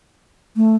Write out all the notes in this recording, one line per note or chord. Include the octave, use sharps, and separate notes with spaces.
A3